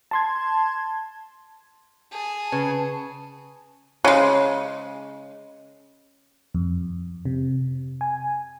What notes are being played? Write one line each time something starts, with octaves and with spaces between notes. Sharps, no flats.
A5 C6 G#6
G#4 A5
C#3 B4
C#3 G#3
F2
C3
G#5